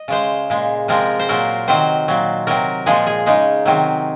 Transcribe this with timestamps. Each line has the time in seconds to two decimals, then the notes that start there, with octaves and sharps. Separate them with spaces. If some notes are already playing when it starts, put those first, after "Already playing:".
Already playing: D#5
0.08 C#3 G#3 C5
0.50 A#2 G#3
0.88 C3 F3 G#3 A#4
1.19 C5
1.29 A#2 F#3 A#4
1.68 C3 D#3 F#3 C5
2.08 A#2 F#3
2.47 C3 F#3 A#4
2.86 A#2 F3 G#3 G#4
3.07 G#4
3.26 C#3 G#3 D#4
3.65 C3 D#3 F#3